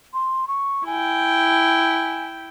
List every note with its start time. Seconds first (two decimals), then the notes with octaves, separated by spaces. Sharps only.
0.13 C6
0.48 C#6
0.86 E4 G5 G#5